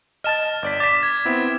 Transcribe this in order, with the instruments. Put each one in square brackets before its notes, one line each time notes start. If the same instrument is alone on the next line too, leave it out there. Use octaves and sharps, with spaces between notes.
[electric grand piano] D#5 A5 A6 [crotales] F6 E7
[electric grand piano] G1 D5 B6
[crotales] D6 E7 [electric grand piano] A6 B6
[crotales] G#6
[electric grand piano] B3 C4 E4